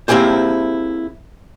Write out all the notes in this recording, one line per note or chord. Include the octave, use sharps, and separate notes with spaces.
A#3 C4 E4 G4 G#4 C5